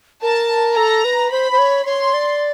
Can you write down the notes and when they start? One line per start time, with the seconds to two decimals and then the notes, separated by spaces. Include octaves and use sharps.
0.22 A#4 A5
0.76 A4 A#5
1.05 B4
1.31 C5 B5
1.52 C5
1.58 C#5
1.86 C#5 C6
2.14 D5